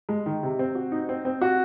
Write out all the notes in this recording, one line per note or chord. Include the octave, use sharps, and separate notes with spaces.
G#3
D#3
C3
C4
F#4
D#4
C4
C4
F#4